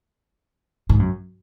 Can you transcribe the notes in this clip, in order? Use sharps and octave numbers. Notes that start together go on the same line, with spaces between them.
G#2
F#2